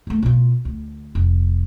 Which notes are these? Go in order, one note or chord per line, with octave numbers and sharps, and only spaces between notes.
D#2 A3
B2 F4
D2
F1